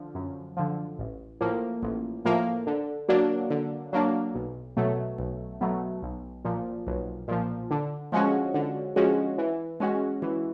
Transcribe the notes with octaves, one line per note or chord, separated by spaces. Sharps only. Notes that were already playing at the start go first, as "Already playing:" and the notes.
Already playing: D3 F3
F#2
D3 F3
A1
A2 F3 A#3
A1
A2 F3 A#3
D3
F#3 A#3 D4
D3
F#3 A#3 D4
B1
B2 F#3 A3
B1
B2 F#3 A3
B1
A#2 F3
B1
A#2 F3
D3
F3 G#3 C#4 F#4
D3
F3 G#3 C#4 F#4
E3
G#3 C#4 F#4
E3